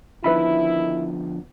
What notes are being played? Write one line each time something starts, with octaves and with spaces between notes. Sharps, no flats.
D3 D#3 F3 B3 E4 B4 E5 B5